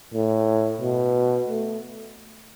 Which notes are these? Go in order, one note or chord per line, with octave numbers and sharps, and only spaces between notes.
A2
B2
A3